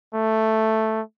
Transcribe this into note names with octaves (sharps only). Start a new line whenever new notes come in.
A3